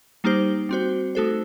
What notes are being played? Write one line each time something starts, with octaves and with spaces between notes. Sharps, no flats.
G3 A#3 D#4 G4 C5
G3 C4 F#4 C5
A3 D#4 F#4 A4 C5